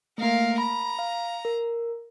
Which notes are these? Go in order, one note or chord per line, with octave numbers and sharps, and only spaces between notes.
A3 A#3 A#4 F5
A#5 B5
F5
A#4